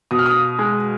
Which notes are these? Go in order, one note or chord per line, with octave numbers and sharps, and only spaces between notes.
B2 D#6
F6
D#6
G#3